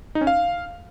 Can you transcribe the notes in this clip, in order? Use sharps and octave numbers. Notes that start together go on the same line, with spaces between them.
D#4
C#4
F5